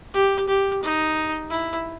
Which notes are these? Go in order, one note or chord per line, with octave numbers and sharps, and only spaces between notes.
G4
G4
D#4
E4